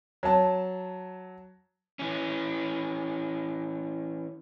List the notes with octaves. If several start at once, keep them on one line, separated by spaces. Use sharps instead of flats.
F#3 A5
E3 C#4